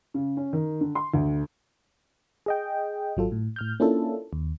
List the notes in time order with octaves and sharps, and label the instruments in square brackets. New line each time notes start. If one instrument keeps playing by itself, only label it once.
[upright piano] C#3
C#4
D#3
D3
C6
D2
[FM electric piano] G#4 D#5 G5
G#1 F#3 F4 A4
A2
A2 F6 G6
A#3 C#4 D4 E4 F4 A4
D#2